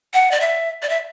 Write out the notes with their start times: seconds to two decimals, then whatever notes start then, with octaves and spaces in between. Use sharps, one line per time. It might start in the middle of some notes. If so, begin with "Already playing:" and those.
0.14 F#5
0.31 D5
0.41 E5
0.83 D5
0.89 E5